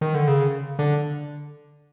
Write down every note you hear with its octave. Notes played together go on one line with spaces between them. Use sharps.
D#3
D3
C#3
D3